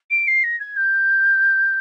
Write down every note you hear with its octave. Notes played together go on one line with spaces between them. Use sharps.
D7
C7
A#6
G#6
G6